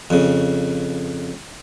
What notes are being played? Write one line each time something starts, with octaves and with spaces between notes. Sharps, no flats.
F2 C#3